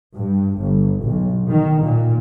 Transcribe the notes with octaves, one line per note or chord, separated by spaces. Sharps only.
G2
G1
B1
D#3
A#2